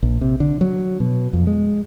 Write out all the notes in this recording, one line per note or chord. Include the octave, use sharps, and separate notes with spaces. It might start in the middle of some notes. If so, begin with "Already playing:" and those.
A#1
C3
D3
F#3
B2
F2
G#3